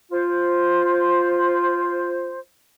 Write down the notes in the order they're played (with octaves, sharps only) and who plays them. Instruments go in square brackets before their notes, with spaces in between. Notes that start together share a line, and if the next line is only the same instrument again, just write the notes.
[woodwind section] F4 C5